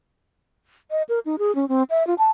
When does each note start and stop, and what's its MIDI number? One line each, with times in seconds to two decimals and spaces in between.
0.91 1.03 75
1.09 1.19 70
1.26 1.36 63
1.39 1.54 68
1.55 1.68 61
1.69 1.83 60
1.90 2.06 76
2.07 2.14 65
2.18 2.31 81